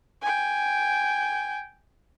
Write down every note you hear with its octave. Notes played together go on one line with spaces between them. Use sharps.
G5 G#5